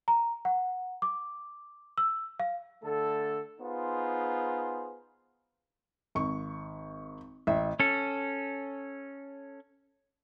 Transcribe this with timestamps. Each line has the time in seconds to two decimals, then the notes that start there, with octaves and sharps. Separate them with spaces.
0.08 A#5
0.45 F#5
1.02 D6
1.98 E6
2.40 F5
2.83 D3 A3 A4
3.60 B3 D#4 F4 G#4 C5
6.15 G#1 C#6
7.47 A1 E5
7.80 C#4 A4